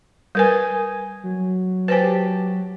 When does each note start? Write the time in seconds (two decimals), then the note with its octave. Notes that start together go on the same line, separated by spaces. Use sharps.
0.35 G3 A#4 B4 D#5 G#5
1.23 F#3
1.88 G4 B4 C5 G#5 A5